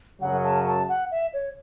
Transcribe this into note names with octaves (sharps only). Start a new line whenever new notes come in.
F#2 C#3 F#3 F#5
A5
A5
F#5
E5
C#5